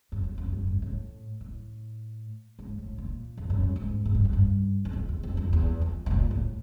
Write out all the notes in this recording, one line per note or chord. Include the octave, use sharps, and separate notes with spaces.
F#2
F2
F#2
F#2
G2
A2
A2
G#2
A2
A#2
F2
F#2
G2
G#2
G#2
G2
F#2
G2
E2
F2
E2
F2
F2
E2
F2
A2
A#2
A2